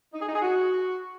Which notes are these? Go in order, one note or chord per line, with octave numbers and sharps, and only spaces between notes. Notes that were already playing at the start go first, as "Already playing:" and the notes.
D#4
G#4
D#4
G#4
F#4